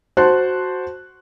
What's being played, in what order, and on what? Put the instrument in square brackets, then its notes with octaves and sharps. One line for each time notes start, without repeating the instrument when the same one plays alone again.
[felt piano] F#4 C5 A5 C6 F#6